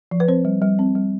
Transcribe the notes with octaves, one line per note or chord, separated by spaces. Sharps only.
F3
B4
C4 C5
G3
G3
C4
G3